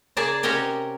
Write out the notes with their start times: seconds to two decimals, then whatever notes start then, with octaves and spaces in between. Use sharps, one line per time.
0.17 C#3 A#3 G#4 D5 A5 A#5
0.43 C3 C#4 F#4 A#4 D#5 G5